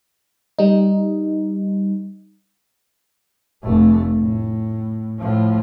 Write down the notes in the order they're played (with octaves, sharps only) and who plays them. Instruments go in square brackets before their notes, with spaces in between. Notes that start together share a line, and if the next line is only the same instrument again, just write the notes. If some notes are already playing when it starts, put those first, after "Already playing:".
[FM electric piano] G3 D#4
[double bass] F1 A3
A2
A2 F3